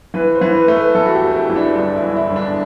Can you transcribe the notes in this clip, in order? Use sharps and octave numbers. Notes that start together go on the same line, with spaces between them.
E3 B4
C5
E3
B4
A3
B4
E3 A4
F#4
G4
E1
E4
E3
D4
G1 D4
E4
E3
E4
G1
D4